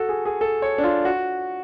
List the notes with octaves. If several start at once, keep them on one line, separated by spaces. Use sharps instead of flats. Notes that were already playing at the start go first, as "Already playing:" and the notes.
Already playing: F#4 A4
G#4
G#4
A4
C#5
D4
F4
F#4